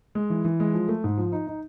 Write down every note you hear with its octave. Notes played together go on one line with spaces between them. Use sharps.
G#3
E3
E3
G#3
F3
A3
G#2
F3
D#4
D#4